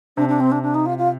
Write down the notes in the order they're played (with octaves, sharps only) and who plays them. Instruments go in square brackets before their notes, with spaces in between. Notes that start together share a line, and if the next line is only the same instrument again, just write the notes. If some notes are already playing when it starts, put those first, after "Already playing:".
[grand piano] C3 [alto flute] D4
[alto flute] D4
C4
D4
D4
D#4
F4
F4